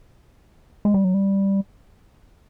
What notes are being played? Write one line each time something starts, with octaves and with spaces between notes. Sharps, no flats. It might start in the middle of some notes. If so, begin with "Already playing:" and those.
G#3
G3
F#3
G3